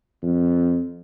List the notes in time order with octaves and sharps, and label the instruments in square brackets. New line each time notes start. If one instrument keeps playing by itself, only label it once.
[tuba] F2